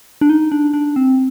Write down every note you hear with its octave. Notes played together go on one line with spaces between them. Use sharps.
D4
D#4
D4
D4
C4